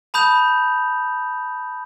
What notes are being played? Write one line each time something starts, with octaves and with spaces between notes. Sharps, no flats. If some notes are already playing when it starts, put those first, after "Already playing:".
A5 B5 D#6 G6 F7